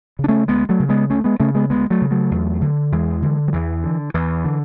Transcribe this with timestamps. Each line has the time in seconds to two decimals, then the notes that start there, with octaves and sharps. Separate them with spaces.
0.19 C#3
0.24 D4
0.29 A3 C#4
0.48 D2 G#3 B3
0.69 F#3 A3
0.80 C#3
0.89 G#3 B3
1.10 D2 A3 C#4
1.24 G#3 B3
1.40 C#3 A3 C#4
1.55 G#3 B3
1.70 D2 G#3 B3
1.90 F#3 A3
2.01 C#3
2.11 F#3 A3
2.31 E2
2.61 D3
2.92 E2 E3 G#3
3.22 D3
3.48 F#3
3.53 E2 E3
3.84 D3
4.14 E2 E3
4.44 D3